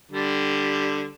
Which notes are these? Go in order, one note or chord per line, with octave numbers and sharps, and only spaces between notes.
D3 G3